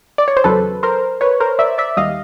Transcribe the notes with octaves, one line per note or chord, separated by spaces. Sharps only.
D5
C#5
C5
E2 C#3 F#3 A4 B4
A#4 C5
B4 C#5
A#4 C5
D5 E5
D5 E5
D#2 D#3 G3 D#5 F5